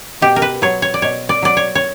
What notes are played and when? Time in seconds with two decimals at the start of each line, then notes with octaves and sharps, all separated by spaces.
0.22 B2 G4
0.36 A#4
0.42 B4
0.62 F#3 C#5
0.82 C#5
0.94 D5
1.02 B2 C#5
1.29 D5
1.42 F#3 D5
1.57 C#5
1.75 C#5